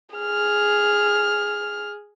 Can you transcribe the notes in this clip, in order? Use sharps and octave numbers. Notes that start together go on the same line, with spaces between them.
G#4 F6